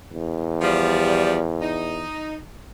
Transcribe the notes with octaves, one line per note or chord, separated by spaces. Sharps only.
E2
F3 G3
D#4